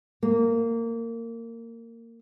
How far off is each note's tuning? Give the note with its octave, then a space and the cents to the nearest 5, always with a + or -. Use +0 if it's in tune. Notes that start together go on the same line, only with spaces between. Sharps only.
A#3 -20